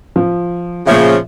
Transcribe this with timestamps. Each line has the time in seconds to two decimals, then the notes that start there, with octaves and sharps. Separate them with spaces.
0.16 F3
0.87 A#2 C#3 F3 E5